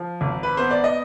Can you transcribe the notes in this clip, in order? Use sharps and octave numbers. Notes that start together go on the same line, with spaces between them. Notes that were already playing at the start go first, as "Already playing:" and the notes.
Already playing: F3
G#1
B4
B3 C5
D5
D#5